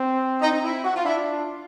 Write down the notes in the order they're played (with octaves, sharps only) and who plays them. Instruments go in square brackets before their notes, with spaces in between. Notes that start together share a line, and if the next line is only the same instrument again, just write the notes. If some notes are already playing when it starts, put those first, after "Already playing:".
Already playing: [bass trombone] C4
[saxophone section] D#4
D#4
E4
F#4
F4
[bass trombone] D4 [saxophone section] E4
[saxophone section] F4